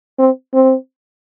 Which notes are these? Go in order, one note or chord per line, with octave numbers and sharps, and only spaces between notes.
C4
C4